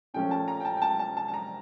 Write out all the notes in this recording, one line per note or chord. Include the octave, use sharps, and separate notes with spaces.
A#2 F3 A3 C#4 G5
A5
A#5
G5
A5
G5
A5
A5
A5
A5
A#5